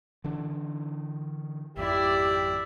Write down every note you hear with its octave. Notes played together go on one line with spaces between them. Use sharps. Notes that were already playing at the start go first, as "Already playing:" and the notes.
D3 E3 D4
G#1 F2 E4 G4 D5